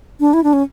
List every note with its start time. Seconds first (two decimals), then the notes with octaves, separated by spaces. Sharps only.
0.20 D4
0.33 E4
0.43 D4
0.53 C#4